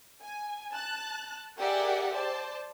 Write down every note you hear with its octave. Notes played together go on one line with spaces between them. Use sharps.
G#5
A5 F#6
G4 G#4 A#4 D5 E5 F#5
C5 D5 A5